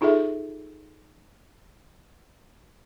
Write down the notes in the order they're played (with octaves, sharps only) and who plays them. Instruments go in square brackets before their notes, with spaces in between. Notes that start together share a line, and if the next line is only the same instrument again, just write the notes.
[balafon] D#4 F4 G#4 A4 E5